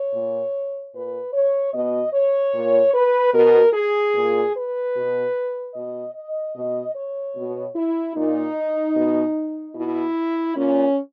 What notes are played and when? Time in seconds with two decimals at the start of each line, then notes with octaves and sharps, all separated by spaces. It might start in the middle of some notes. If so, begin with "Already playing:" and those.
Already playing: C#5
0.12 A#2
0.93 A#2 B4
1.34 C#5
1.74 B2 D#5
2.13 C#5
2.53 A#2
2.94 B4
3.33 B2 A#4
3.73 G#4
4.14 A#2
4.54 B4
4.95 B2
5.74 B2 D#5
6.15 D#5
6.56 B2
6.96 C#5
7.36 B2
7.75 E4
8.15 A#2 D#4
8.95 B2
9.75 B2 E4
10.56 A#2 C#4